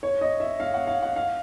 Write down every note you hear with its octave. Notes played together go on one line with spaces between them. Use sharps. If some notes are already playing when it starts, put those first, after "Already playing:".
C#5
D#5
E5
F5
F#5
F5
F#5
F5